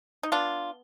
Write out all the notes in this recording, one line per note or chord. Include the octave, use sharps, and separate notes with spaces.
D#4
B3 D4 F4